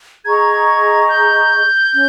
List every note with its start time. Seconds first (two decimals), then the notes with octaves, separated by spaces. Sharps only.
0.25 G#4 D#5 A#5 C#6 G#6
1.09 G6
1.94 C#4